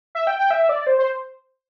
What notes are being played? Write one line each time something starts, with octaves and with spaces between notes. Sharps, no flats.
E5
G5
G5
E5
D5
C5
C5